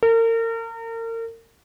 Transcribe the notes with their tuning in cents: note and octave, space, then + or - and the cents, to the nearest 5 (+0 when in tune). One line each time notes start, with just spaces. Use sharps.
A#4 -35